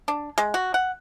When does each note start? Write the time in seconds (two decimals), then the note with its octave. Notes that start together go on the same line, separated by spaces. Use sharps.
0.08 D4
0.38 G#3
0.54 F#4
0.74 F#5